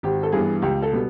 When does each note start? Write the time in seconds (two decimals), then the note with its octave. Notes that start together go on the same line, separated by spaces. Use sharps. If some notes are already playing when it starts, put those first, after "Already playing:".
0.03 G#1 G4
0.23 A4
0.32 G2 E3 G3 B3 G#4
0.62 C#2 G4
0.82 A4
0.92 B2 G3 B3